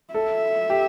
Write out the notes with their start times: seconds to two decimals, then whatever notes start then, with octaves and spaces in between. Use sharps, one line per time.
0.14 A4 E5
0.70 G4